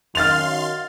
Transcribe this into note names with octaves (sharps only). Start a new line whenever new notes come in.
F#2 D#3 F5 C6 F6 A6 F7